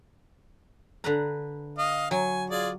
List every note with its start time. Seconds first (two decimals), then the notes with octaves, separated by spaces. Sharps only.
1.04 D3 B4 A#5
1.78 D#5 F5
2.11 F#3 G#5
2.50 F4 G#4 D5